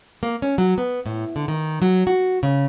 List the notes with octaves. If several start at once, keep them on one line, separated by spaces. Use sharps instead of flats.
A#3
C#4
F#3
B3
A2
D3
D#3
F#3
F#4
C#3